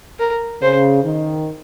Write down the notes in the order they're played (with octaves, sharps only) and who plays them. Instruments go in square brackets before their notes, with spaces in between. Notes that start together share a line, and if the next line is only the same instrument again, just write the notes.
[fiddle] A#4
[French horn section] C#3 [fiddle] C5
[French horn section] D#3